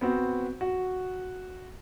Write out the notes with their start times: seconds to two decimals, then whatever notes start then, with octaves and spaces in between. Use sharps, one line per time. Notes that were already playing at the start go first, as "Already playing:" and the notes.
0.01 B3 C4 F#4
0.61 F#4